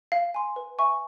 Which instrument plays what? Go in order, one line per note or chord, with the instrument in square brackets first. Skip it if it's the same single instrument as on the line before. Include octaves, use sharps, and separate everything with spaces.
[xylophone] F5
G#5 C6
B4
E5 G#5 C#6